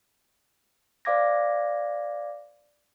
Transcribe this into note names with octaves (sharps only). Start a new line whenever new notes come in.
C5 D5 F5 D6 G#6 A#6